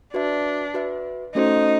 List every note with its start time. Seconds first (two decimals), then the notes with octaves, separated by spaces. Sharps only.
0.13 D4 F#4 B4 E5
0.74 F#4 B4 E5
1.34 A3 C#4 D#4 F#4 A4 C5